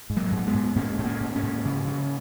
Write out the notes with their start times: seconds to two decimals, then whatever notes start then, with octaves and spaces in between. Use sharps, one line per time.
0.10 G#2
0.17 F#3 A#3
0.32 G#2
0.39 A#3
0.47 G#3 B3
0.54 G#2
0.76 G#2 A#3 C#4
0.98 G#2
1.05 A#3 C#4
1.20 G#2
1.36 A#3 C#4
1.43 G#2
1.65 C#3
1.87 C#3